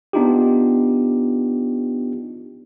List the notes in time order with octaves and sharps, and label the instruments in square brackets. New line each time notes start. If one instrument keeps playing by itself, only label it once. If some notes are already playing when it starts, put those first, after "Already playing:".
[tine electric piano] B3 D4 D#4 F4 G4